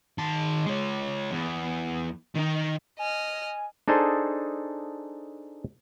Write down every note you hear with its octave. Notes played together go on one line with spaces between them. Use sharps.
D#3 A5
G#3 C#5
E2
D#3 D#4
D#5 G#5 F6
D4 D#4 G#4 A4 C5